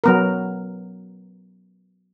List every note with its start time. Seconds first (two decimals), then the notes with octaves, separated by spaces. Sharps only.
0.04 F#3 B3 A#4